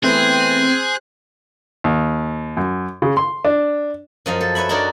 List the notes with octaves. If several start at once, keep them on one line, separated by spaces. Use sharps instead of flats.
E3 A3 B3 C4 G#4 C5 F#6
D#2
F#2
C#3
C6
D4
F#2 F3 D#5
A4
B4 C#5 E5 B5
D4 D#4 F#4 A#4 C#5 D5